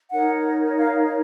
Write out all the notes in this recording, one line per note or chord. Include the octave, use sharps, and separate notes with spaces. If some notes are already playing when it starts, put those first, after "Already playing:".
D#4 A#4 C#5 F#5
F5